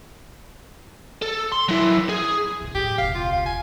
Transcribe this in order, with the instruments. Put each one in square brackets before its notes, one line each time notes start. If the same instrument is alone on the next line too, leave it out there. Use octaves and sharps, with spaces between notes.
[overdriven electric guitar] A4
C6
F#3 E4
G#4
[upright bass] D#1 D3
[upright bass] A2 [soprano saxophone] G4
[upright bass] E1 C#2 [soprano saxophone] F5
[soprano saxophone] F4
F5
G#5